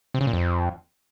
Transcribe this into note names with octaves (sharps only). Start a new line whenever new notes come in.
C3
C#3
A#2
F2